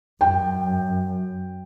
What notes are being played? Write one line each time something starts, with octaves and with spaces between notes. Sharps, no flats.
F#2 G5